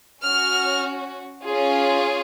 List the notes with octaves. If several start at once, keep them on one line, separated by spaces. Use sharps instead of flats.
C#4 F#4 F6
C#4 F4 G#4